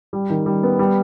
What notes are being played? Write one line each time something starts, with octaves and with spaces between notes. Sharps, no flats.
G3
D#3
G3
B3
G3